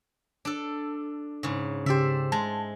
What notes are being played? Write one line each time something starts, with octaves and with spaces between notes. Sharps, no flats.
D4 A4
G#2 C#3
C#3 G4 C5 D5 E5
G#3 A5